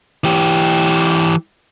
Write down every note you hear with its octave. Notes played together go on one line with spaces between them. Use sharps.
E3 G4